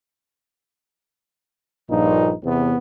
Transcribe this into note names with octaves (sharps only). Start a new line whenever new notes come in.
A#1 G2 A#2 D#4
E2 C3 B3